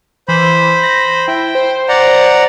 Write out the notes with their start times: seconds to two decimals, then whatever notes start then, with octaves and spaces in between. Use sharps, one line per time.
0.28 E3 C5 B5
0.83 A#6
1.28 E4 G5
1.55 C5
1.89 D5 F#5 A#5